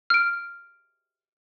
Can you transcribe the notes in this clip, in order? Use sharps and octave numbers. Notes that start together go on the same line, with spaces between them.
F6 D7